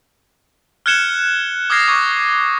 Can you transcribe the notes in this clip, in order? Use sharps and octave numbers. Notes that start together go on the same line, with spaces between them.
F6 F#6 G#6 C#7 E7 G7
D6 D#6 F6 G#6 A#6 C7
C#6 D6 G#6